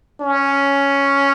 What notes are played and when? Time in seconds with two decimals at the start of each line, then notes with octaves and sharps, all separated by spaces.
0.21 C#4